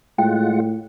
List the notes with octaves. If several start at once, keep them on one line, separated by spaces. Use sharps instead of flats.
A2 G#3 F4 F#5 G5